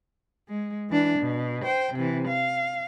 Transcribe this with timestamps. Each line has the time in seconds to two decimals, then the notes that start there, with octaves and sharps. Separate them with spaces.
0.49 G#3
0.90 E3 D4
1.19 B2
1.64 C5 G5
1.95 C3 E3
2.28 F5